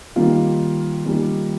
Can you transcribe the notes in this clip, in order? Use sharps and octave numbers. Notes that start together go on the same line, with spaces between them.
D#3 G3 A#3 F4
D#3 G3 A#3 F4